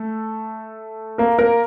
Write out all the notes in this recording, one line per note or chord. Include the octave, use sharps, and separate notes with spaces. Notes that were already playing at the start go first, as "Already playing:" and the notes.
Already playing: A3 A4
A#3 A#4
A#3 A#4